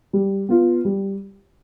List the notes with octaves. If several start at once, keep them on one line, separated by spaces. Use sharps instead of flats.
G3
B3 F4
G3